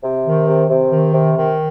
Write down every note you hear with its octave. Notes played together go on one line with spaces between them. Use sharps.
C3
D#3
C3
C3
D#3
C3
D#3